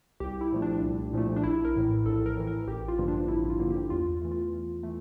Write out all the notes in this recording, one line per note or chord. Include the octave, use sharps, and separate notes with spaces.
C2 G4
E4
A#2 F3 A3
D4
C2
A#2 F3 A3
D4
A#1 E4
A#4
A2 E3
A#1 A4
A#4
A2 E3
A#4
A1 G4
F4
G2 D3 F3 A#3
D4
A1 E4
F4
G2 D3 F3 A#3
G4
E2 F4
E3 A3
F4
E2
E3 A3